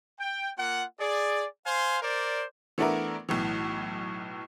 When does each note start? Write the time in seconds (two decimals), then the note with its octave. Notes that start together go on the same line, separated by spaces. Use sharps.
0.19 G5
0.57 A#3 F4 F#5
0.99 G#4 D5
1.65 C5 F5 G#5 C6
2.02 A#4 C5 D5
2.78 E3 A3 B3 D4 E4 A#4
3.29 B1 A2 E3